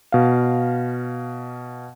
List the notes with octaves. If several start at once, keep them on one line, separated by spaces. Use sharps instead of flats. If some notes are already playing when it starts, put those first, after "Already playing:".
B2 F5